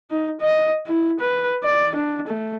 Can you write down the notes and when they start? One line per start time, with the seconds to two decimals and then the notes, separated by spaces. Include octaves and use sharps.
0.11 D#4
0.41 D#5
0.86 E4
1.20 B4
1.64 D5
1.95 D4
2.27 A3